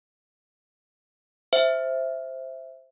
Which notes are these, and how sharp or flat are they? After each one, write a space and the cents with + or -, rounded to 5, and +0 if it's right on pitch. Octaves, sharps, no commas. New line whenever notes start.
C5 +0 E5 +0